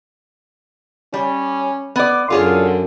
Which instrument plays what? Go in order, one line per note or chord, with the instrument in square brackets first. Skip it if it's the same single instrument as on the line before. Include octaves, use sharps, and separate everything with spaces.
[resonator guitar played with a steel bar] G3 [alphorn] C#4
[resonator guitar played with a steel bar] B3 D5
[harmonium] F#2 [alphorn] D3 [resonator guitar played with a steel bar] F4 G#4 C#5